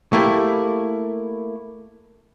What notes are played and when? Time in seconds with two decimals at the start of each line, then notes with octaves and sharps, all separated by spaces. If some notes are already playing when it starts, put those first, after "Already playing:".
0.13 A3 A#3 E4 G4